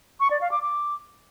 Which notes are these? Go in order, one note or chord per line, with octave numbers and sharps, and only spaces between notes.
C#6
D5
F5
D6
D6